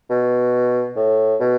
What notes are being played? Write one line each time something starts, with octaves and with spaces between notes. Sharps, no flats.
B2
A2
B2